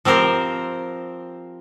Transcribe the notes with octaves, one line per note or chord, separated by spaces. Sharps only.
F3 C4 G4 A#4 C5